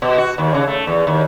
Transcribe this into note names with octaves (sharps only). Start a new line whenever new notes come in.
B2
F#4
D#2
C#3
A3
E2
D#2